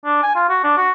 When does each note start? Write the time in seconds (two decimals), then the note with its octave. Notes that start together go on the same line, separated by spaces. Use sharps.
0.04 D4
0.23 G#5
0.35 F4
0.49 F#4
0.63 D4
0.77 F#4